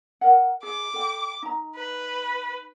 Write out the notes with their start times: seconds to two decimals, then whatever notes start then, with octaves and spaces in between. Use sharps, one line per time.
0.21 A#4 F#5
0.63 G#4 D6
0.94 A4 G5
1.43 D#4 A#5
1.76 B4